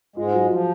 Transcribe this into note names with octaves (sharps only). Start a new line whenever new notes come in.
G#2 G#3 F4
F#3
F3 F4